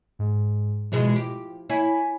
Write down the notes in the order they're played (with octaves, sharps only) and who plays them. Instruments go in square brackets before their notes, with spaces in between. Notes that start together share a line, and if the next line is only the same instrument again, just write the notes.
[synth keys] G#2
[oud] E2 B2 G#3 [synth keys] F3
[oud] G4
[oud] E4 [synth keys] C#5 G#5 B6